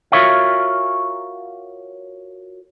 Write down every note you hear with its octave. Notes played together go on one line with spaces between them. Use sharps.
F4 F#4 A#4 C#5 E5 F5